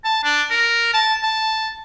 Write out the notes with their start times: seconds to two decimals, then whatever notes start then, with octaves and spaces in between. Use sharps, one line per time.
0.04 A5
0.24 D4
0.50 A#4
0.94 A5
1.23 A5